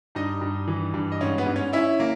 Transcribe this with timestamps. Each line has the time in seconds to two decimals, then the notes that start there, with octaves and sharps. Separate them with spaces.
0.15 G2 D#4 D#5
0.41 G2
0.68 E3
0.94 G2
1.12 D#5
1.21 G#2 C#4 C#5
1.38 B3 B4
1.47 G#2
1.56 C#4 C#5
1.73 C#4 E4 E5
2.00 A#3